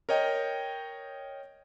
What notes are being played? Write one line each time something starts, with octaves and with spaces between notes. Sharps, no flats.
A#4 C#5 D#5 G5